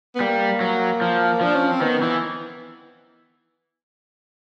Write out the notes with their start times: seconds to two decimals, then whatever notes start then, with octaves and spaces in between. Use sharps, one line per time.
0.15 B3
0.21 G3 A#3
0.61 F#3
1.02 F3
1.41 F3 D4
1.55 C#4
1.69 C4
1.82 D#3 B3
2.02 E3